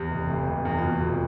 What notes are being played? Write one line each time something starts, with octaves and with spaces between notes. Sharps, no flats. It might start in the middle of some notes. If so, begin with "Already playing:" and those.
Already playing: E2 G4
F1
F1
F1
E2
F4
B2 F#4
F1